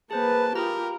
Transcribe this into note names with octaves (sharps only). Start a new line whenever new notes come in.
A#3 G#4 B4 C5 A5
F4 G4 A#4 A#5 B5 D#6